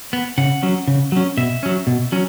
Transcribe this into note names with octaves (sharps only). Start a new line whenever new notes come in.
B3
C#3 F#5
F#3 C#4
C#3
F#3 C#4
B2 E5
F#3 C#4
B2
F#3 C#4